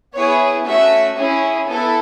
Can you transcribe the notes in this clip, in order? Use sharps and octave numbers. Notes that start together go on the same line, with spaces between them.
B3 E4 G#4 C#5
A3 C#4 F#4 E5
C#4 E4 G#4
B3 E4 A4